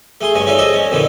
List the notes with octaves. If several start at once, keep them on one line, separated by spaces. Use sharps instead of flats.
A3 G#4 C6
G2 G#3 C#4 G#5
C#4 D#4 F4 A4 D5
G#4 A4 C5 D5 D#5
C#4
F2 A#2 D3 E3 D#4